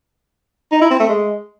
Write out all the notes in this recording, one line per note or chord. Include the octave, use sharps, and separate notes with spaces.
D#4
E4
C4
A3
G#3